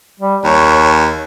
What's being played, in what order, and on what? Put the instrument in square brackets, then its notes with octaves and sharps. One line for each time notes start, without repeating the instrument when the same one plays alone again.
[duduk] G3
[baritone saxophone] D#2 [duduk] C#5